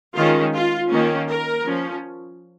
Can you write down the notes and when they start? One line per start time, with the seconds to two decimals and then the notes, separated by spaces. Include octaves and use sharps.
0.15 D#3 G#3 C#4 F4
0.54 F4
0.91 D#3 A#3 C#4
1.29 A#4
1.66 F3 C#4